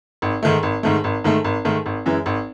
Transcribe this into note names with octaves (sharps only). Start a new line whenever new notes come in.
G#1
G#2 D#3 A3
G#1
G#2 D#3 A3
G#1
G#2 D#3 A3
G#1
G#2 D#3 A3
G#1
F#2 E3 G#3
G#1